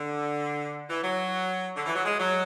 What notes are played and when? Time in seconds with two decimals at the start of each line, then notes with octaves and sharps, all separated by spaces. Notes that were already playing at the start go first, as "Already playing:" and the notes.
Already playing: D3
0.89 E3
1.03 F#3
1.77 D3
1.86 E3
1.95 F#3
2.05 G#3
2.20 F#3